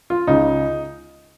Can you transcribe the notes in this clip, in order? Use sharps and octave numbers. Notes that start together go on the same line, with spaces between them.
F4
C#2 C#3 D#4